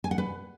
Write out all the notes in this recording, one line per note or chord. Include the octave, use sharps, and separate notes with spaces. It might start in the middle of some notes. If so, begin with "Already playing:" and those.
G#5
F#5
B4